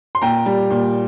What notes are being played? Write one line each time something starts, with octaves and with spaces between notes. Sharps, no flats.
C6
A#2 G5 A#5
G3
A#2